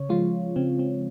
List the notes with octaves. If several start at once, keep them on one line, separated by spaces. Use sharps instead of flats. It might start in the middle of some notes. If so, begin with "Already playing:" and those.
Already playing: C#3 C#5
F3 G#3 F4
C#3 C4
C4